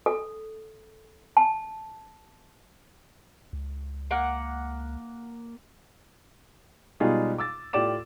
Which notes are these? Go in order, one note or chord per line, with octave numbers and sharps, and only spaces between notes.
A4
A5
C#2
A#3 F#5
B2 G3 G#3 D#4 F4 G#4
D6 E6 A6
A2 F4 G4 D5 D6 E7